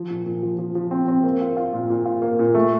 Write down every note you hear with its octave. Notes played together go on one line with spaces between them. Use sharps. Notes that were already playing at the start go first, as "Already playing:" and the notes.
Already playing: F3
A#2
A#2
F3
F3
F3
C4
C4
A#3
F4
F4
A#2
A#2
F4
A#3
A#2
A3